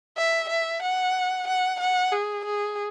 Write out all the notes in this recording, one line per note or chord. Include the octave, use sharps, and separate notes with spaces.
E5
E5
F#5
F#5
F#5
G#4
G#4